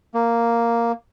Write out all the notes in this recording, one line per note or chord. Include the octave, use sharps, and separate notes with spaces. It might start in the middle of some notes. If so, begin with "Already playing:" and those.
A#3